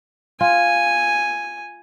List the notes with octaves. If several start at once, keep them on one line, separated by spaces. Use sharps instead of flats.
F4 G#5